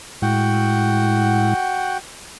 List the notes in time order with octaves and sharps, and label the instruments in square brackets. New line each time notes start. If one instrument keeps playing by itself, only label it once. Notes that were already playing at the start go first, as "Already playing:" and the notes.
[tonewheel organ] A2 G#3 E4 [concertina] F#4 F#5 G5